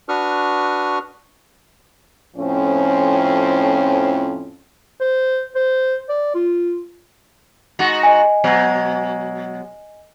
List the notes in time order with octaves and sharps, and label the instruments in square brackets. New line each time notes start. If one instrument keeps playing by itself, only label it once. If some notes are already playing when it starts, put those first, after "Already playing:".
[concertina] D4 F#4 B4 C#6 D#6 F6
[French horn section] F2 A2 F3 C4 C#4
[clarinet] C5
C5
D5
F4
[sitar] G#3 D#4 F#4
[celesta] D#5 G#5
[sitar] B2 F#3 G#3